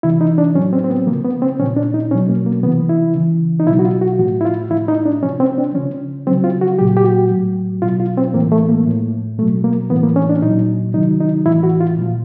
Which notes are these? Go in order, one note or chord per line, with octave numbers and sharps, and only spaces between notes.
C3 E3 E4
D#4
D4
A2 F#3 C#4
C4
C4
B3
C#3 F3 A#3
B3
C4
A#2 F3 C#4
D4
D#4
B2 F#3 C#4
A#3
A#3
C3 E3 B3
E4
C#3 E3
D#4
B2 F#3 E4
F#4
F4
F#4
A2 F3 F#4
E4
F4
A2 F3 E4
D#4
D4
C3 F3 C#4
C4
D4
C#3 F3 C#4
C#3 F#3 C4
F4
F#4
A#2 F#3 G4
G4
F#4
A2 F#3
B2 F#3 F4
F4
C4
A2 E3 A#3
A3
A#3
A2 F3
B2 F#3 A3
A#3
A2 E3 B3
A#3
C#4
D4
A#2 F#3 D#4
C3 D#3 F#3 D#4
D#4
A2 E3 E4
F#4
F4
A#2 F3